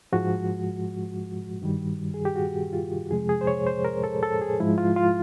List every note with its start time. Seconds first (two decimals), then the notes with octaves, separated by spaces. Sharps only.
0.12 G#2 F3 G#3 F#4
1.62 G2 D#3 G3
2.14 G#4
2.25 G4
2.36 F#4
2.73 F4
3.11 F2 C3 F3 G#3 G#4
3.29 G#4
3.41 C5
3.47 C#5
3.67 C5
3.85 A#4
4.04 A4
4.23 A4
4.42 G#4
4.60 G#2 F3 G#3 E4
4.78 F4
4.96 F4